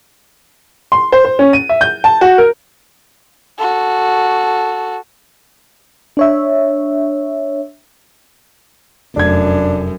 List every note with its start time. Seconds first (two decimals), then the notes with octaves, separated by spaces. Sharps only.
0.92 C6
1.12 C5
1.25 C5
1.39 C#4
1.53 D#7
1.69 E5
1.81 G6
2.04 A5
2.21 F#4
2.38 A#4
3.58 F#4 A4
6.17 D4 C#5 E5
9.16 F1 F#2 D4 G#6